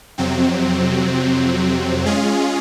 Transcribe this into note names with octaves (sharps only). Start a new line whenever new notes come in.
F2 C3 F#3 C4
G#3 C#4 F4 G#4